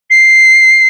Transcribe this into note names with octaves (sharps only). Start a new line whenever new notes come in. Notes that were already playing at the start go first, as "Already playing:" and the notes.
C7